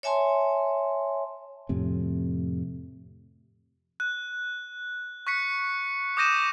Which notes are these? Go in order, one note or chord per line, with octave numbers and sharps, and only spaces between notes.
C#5 E5 G#5 A5 C6
F2 A2 C3
F#6
C#6 F#6 B6 C#7
D6 D#6 G6 A#6 D#7 E7